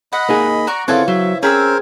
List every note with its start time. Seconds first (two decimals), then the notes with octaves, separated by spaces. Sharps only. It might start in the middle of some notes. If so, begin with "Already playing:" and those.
0.13 D#5 F#5 B5
0.29 A#3 D#4 G#4
0.67 F#4 D5 A#5 C#6
0.88 C#3 E3 C4 F4 G#4 A4 F#5
1.08 F#3 C5 E5
1.43 C4 C#4 G#4 A#4 C5 B5 E6